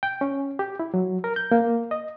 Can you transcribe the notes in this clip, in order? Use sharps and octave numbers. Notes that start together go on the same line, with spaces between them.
G5
C#4
G4
E4
F#3
A#4
G6
A#3
D#5